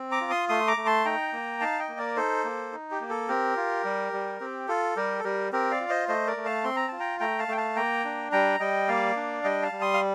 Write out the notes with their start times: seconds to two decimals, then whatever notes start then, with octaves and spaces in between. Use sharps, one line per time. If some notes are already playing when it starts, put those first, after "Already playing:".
Already playing: C4
0.11 A#5 D6
0.21 F4
0.30 C6 D#6
0.49 A3 C6 D#6
0.68 A#5 D6
0.77 A3
0.86 A5 C6
1.05 D#4 G5 A#5
1.33 A#3
1.61 D#4 F5 A5
1.79 D#5 G5
1.89 A#3
1.98 A#4 D5
2.16 D#4 A4 C5
2.44 A#3
2.72 D#4
2.91 G4
3.01 A#3
3.10 A4
3.28 C4 G4 A#4
3.57 F4
3.85 G3
4.13 G3
4.41 C4 G4
4.68 F4 A4
4.96 G3 G4 A#4
5.19 A4
5.24 G3 G4 A#4
5.52 C4 G4 A#4
5.71 D5 F5
5.80 F4
5.89 C5 D#5
6.08 A3 C5 D#5
6.27 A#4 D5
6.37 A3
6.45 F5 A5
6.64 C4 C6
6.76 A#5
6.88 F4 A5
7.00 G5 A#5
7.20 A3 G5 A#5
7.39 F5 A5
7.48 A3 G5
7.57 F5 A5
7.76 A#3 G5 A#5
8.04 D4
8.32 G3 G5 A#5
8.60 G3 D#5 G5
8.88 A#3 D5 F5
9.16 D4
9.44 G3 D#5 G5
9.62 F5 A5
9.72 G3
9.81 C6 D#6
9.93 F5